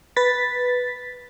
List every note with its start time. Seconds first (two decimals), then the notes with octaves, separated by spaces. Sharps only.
0.16 B4 A6 B6